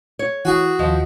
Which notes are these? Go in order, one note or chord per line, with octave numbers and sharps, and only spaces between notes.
C#5
E3 F#4 G#4
D#2 F3 D#5